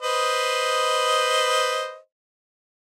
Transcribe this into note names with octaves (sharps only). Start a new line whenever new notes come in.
B4 C5 D#5